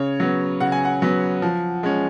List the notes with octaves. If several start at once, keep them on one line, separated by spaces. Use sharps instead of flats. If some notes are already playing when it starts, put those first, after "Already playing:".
Already playing: C#3 C#5
F#3 B3
C#3 F#5
G#5
F#5
F#3 B3
F3
G#3 C#4